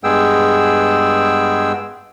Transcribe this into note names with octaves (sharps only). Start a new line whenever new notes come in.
G2 G#3 B3 G#4 G5 E6